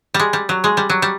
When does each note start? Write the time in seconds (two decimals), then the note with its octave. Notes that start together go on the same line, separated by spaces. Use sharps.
0.14 G3
0.19 G#3
0.33 G3
0.49 F#3
0.64 G#3
0.77 G3
0.90 F#3
1.02 G3